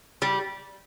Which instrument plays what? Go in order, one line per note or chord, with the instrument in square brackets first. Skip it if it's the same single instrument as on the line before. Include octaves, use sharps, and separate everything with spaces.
[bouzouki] G3